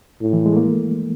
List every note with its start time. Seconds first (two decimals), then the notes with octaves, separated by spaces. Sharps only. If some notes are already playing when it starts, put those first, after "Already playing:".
0.21 A2
0.33 E3
0.46 G#3
0.53 A3
0.57 A#3